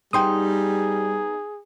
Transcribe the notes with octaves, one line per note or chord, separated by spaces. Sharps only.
G3 B3 D#4 G#4 G5 C6 D#6